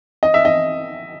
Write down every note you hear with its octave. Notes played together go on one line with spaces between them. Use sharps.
D#5
E5
D#5